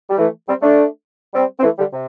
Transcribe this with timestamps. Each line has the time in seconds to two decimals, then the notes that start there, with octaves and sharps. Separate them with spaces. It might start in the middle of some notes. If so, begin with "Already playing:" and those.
0.10 G3
0.18 E3 A3
0.48 G3 C4
0.62 A3 D4
1.34 G3 C4
1.60 C4
1.63 E3 A3
1.78 D3 G3
1.93 C3